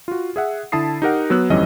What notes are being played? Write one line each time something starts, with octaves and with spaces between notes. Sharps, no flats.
F4 F#4
G#4 E5 F#5
D3 E4 A5 B5 D#6 C7
D#4 G4 A#4 F#5
F#3 B3 E6 F#6
G1 F2 E3 G3 C#4 D#5